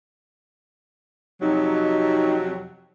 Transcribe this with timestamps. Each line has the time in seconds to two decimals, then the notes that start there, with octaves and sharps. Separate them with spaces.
1.42 F2 C3 F#3 D#4